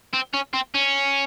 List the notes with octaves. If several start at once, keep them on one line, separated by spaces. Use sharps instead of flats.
C4
C#4
C4
C#4